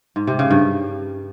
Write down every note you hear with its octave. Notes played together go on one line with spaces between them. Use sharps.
G#2
C3
C#3
G2